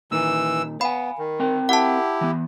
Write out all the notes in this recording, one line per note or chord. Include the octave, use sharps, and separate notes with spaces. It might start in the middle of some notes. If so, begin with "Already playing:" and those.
A#2 D#3 E3 E6
B3 F5 G#5 B5
D#3
C4 A#4 G5
E4 G4 F#5 A5
E3 B3